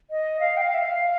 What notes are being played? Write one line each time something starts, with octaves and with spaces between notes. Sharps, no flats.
D#5
F5
G5
F5
E5
F5